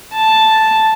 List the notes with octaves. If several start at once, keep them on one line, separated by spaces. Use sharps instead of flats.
A5